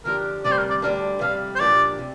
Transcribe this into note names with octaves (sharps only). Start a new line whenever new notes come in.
D3 F3 D4 G4 A#4
D2 C3 G3 C4 D5
C5
A#4
D5
D2 D3 G3 D4 A#4
F2 C3 G3 F5
C5
A#2 F3 D4 G4 D5
C3